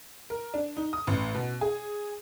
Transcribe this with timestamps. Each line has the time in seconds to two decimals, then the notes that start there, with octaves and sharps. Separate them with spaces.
0.30 A#4
0.54 D4
0.77 D#4
0.93 D#6
1.07 A1
1.35 B2
1.61 G#4